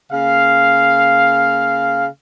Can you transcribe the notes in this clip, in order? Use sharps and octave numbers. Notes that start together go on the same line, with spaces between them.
C#3 A#3 F5